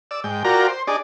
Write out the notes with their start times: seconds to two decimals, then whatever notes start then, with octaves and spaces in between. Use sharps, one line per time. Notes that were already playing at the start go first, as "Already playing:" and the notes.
0.11 D5 E6
0.24 G#2 G5
0.44 F4 F#4 A#4 D5 G5 A#5
0.68 C5
0.87 D4 D#4 G#4 D5